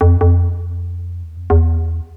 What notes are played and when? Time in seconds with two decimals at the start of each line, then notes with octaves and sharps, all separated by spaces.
0.01 F2
0.21 F2
1.23 E2
1.37 F2
1.50 E2